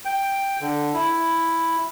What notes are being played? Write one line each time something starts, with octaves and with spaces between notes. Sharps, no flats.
G5
D3
E4